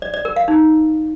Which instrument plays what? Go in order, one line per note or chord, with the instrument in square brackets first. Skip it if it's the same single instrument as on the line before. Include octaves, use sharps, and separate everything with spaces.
[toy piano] D5
D5
A#4
F5
D#4